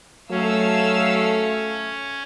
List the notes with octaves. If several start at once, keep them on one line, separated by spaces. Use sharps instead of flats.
F#3 A3 C#4 F5 E6